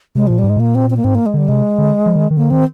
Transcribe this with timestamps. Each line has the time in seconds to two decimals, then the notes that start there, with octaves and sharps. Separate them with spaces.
0.15 C3 G#3
0.27 A#2 F3
0.39 G3
0.44 G#2
0.50 G#3
0.56 A#2 A#3
0.75 C4
0.90 C4
0.97 A#3
1.04 G#2 C4
1.15 A#3
1.26 G#3
1.34 D3 G3
1.48 C3 G#3
1.78 D3
2.06 F3
2.16 D#3
2.31 D#3
2.37 D3 A#3
2.50 D#3 C4